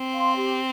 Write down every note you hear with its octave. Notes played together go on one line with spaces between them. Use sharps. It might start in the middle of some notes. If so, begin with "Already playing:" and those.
Already playing: C4
F5 C6
G4